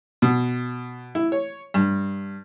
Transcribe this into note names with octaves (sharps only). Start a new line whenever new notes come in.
B2
E4
C#5
G2